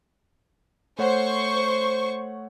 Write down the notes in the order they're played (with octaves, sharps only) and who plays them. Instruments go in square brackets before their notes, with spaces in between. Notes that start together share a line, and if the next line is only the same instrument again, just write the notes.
[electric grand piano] A3 C#5 F#5 [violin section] C5 C#6